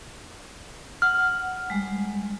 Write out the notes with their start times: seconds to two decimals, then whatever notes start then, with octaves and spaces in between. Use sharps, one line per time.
1.02 F#5 F6
1.70 G3 G#3